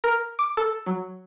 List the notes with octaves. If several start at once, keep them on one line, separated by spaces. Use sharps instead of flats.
A#4
D6
A4
F#3